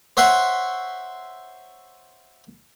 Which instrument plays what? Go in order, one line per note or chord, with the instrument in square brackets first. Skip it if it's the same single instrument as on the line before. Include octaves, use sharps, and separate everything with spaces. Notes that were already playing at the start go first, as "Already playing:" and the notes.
[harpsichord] C5 C#5 E5 F#5 C6 C#6